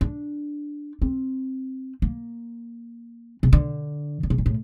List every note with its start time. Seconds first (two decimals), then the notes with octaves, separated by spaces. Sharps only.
0.01 D4
1.02 C4
2.02 A#3
3.43 C3
3.53 D3
4.23 D3
4.30 C3
4.38 A#2
4.46 A2